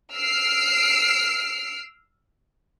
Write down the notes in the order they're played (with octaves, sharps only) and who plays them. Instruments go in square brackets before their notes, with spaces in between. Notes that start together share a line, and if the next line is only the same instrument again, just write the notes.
[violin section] E6 F6 C7 D7